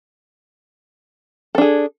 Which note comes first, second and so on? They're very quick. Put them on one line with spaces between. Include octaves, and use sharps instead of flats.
A4 D4 G#4